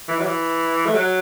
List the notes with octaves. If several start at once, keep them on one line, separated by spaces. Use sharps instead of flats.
E3
F#3
E3
A3
F#3